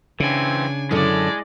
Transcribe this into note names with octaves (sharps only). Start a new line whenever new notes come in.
C#3 E3 C4 D4 G#5
F#2 D3 G#3 E4 A4 D5